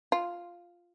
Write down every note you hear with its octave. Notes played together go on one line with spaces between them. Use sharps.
F4